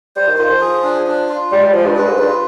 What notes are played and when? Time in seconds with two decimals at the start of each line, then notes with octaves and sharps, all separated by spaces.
0.16 G3 C5
0.27 D#3
0.38 D#3 F4
0.50 F3
0.61 G#4
0.84 D4
1.07 D4
1.29 F4
1.52 G3 G#3
1.63 G3
1.74 F3 G#3
1.85 G2
1.97 G2 B4
2.08 G#2
2.19 G2 F4